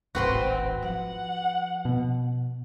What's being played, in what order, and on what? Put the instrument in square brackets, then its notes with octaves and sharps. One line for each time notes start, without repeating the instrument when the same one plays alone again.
[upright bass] D1 G#1 [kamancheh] C4 [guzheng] F#4 B4 C6
[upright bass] F3 [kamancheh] F#5
[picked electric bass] B2